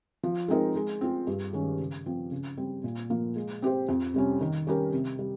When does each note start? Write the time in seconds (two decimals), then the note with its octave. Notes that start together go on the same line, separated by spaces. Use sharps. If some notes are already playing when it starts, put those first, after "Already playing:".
0.23 F3
0.48 G#3 C4 D#4 A#4
0.76 G#3
1.01 C4 F4 G#4
1.27 G2
1.53 D#3 G#3 C#4
1.80 C#3
2.06 F3 C4
2.31 C#3
2.57 G3 C4
2.84 A#2
3.10 F3 A#3
3.36 G#3
3.62 C4 G4 C5
3.89 F2
4.14 C3 G3 C#4
4.41 D#3
4.67 G3 C#4 G4 A#4
4.93 C3
5.19 G3